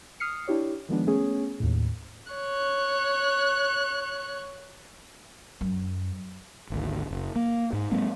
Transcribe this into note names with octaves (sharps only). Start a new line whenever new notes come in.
D#6 F6 C7 C#7
D4 E4 G4 C#5
D#3 F3 G#3 B3 D4
A3 B3 C#4 G#4 C#5
D#2 A2
C#5 F#6
F#2
G#1 D2
F#1
A#3
G#2
F#3 G#3 A#3 C4